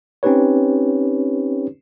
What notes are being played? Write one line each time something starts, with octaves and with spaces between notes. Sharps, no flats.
C4 C#4 D#4 G4 B4 C#5